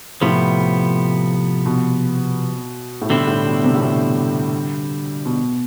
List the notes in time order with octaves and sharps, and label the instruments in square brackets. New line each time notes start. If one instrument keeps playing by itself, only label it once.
[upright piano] A2 [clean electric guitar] C3 F3 B3
[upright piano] B2
A2
[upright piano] B2 [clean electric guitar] D3 G3 C4 E4
[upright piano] A2
B2
C3
A2
B2
B2